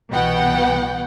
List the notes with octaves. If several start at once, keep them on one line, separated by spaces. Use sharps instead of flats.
C2 B2 E3 B3 F#5 G5